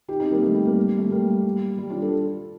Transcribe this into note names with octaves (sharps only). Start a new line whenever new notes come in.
D#4 G4
C4 D#4
G3 A#3
A3
G3
G3 A#3
A3
G3 A#3
G3
D4 F4
F4 A4